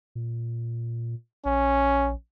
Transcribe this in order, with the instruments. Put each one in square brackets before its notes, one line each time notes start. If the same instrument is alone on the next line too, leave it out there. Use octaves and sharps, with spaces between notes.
[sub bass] A#2
[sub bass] A#1 [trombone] C#4